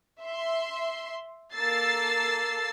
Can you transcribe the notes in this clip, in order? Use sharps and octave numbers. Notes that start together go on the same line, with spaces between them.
E5 C6
A#3 A4 E6 A6 C7